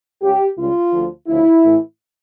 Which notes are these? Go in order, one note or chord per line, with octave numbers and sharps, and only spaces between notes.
C#2 C#3 G3 G4
C#2 C#3 G3 F4
D2 D3 F3
D2 C#3 F3 E4
A2 E3 A3